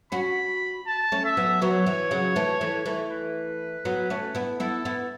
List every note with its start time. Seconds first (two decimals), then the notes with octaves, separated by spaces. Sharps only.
0.12 C#4 F#4 B5
0.87 A5
1.12 A3 C#4
1.25 E5
1.37 F#3 B3
1.62 F#3 B3 C#5
1.86 E3
2.11 C#3 F#3
2.36 E3 A3
2.61 E3 A3
2.86 E3 A3
3.11 B4
3.85 F#3 B3
4.10 A3 C#4
4.35 B3 E4
4.60 B3 E4 A4
4.85 B3 E4